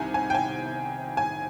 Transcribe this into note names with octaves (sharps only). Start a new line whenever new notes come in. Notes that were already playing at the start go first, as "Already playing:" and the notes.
Already playing: C2 C3 D#3 G#5
G#5
G5
G#5
G#5